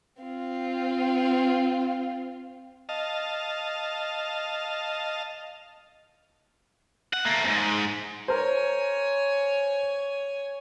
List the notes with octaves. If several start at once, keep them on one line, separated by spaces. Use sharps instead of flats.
C4 F4
D#5 F5 A5
F#5
A3 A#3
E2 G#2
A#4 C5 C#5 G#5